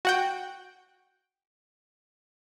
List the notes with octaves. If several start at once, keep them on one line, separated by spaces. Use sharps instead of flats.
F#4 F#5 G5